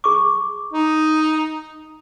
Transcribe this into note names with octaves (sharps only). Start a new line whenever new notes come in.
G#4 C#6 D6
D#4